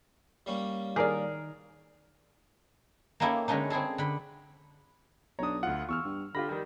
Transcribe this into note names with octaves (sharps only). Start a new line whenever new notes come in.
G3 A#3 C#4
D#3 G#4 A#4 D5
A#3 C#4 D#4 E4 G4 A4
D3 G#3 A3 C#4 D#4
C4 E4 G#4 A4
D3 B5
B1 D4 C#5 A#5 D#6
D2 F4 F#5
E2 C#6 E6 F6
G2
D3 F4 G4 B5 A#6
D#3 G3